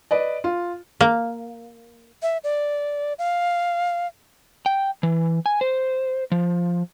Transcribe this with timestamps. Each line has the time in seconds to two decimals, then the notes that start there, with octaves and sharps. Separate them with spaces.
0.11 B4 D5 D#5
0.44 F4
1.01 A#3
2.22 E5
2.44 D5
3.19 F5
4.66 G5
5.03 E3
5.46 G#5
5.61 C5
6.32 F3